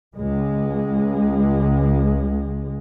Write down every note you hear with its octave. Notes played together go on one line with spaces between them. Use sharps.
C#2 G#3